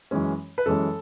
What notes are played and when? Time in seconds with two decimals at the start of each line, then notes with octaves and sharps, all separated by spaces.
0.11 F#2 E3 G#3 C#4
0.58 B4
0.66 F#2 E3 G#3 C#4 A4